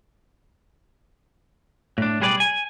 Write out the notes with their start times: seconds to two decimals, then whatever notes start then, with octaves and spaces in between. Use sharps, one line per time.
1.98 A2 D4
2.21 B1 G3 G#4 B4 D5
2.40 G#5